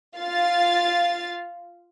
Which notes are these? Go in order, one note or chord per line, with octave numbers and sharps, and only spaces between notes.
F4 F5 A6